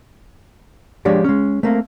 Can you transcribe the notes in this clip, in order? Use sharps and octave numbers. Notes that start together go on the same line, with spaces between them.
F3 G#3 D4 G4 C#5 D5
G#3 C#4
A3 A#3 C4